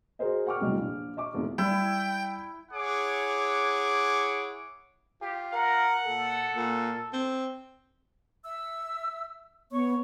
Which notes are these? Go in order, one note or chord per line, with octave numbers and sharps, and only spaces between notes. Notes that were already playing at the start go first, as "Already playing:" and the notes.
F#4 G#4 A#4 C5 D#5
F#5 G5 C#6 D6 F6
E2 A2 C3 F#3 G3 D#4
A#1
D#5 E5 C#6 D6
A1 F2 G#2 B2 D#3 A3
G3 E4 G5
E4 G#4 C#5 F#5 D6
F4 G4
A#4 F#5
A#2 A4
A#2
C4
E5 E6
B3 C#5 C#6